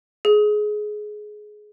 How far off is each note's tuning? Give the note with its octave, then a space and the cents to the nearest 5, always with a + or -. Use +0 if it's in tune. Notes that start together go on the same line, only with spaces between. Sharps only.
G#4 +20